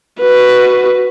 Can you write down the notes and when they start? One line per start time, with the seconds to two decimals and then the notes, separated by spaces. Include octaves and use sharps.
0.20 F#4 B4